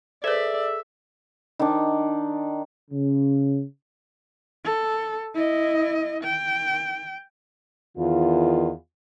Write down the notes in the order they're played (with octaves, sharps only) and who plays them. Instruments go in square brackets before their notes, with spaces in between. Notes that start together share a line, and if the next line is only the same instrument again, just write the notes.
[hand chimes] G#4 A4 [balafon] B4 C5 [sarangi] D5 [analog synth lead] E5
[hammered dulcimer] D#3 D4
[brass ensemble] C#3
[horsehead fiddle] A4
E4 D#5
G5
[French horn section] E2 D#3 F4